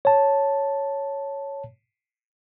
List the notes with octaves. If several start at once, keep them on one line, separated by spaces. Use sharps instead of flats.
C#5 A5